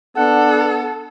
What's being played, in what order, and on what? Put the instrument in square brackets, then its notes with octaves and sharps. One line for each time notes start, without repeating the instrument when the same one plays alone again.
[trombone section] B3 D4 [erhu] A4 [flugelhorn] F#5